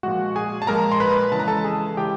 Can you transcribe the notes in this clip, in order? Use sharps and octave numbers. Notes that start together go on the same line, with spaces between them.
A#2 F3 G#3 F#4 F#5
G#4 G#5
A5
A#2 F3 G#3 A#4 A#5
C6
B4 B5
C#3 E3 G#3 A5
A#5
A4 A5
G#4 G#5
C#3 E3 G#3 G4 G5